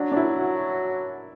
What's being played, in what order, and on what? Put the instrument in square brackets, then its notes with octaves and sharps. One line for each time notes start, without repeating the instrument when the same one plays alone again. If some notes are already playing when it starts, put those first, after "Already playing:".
Already playing: [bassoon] F#3 [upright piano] D4
[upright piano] D4
E4
F#4